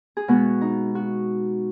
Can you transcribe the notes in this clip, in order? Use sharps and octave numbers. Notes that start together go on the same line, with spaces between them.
G#4
B2 G#3 B3 F#4
D#4
F#4